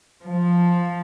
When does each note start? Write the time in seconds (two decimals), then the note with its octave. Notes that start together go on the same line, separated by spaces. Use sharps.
0.23 F3